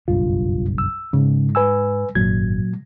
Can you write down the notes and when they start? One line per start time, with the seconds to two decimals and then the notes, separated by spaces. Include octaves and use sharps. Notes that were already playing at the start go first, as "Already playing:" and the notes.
0.08 F#1 B1 G2 F4
0.78 E6
1.13 G#2 C#3
1.55 B4 G#5 E6
2.15 G#1 F#2 A#2 F#3 G#6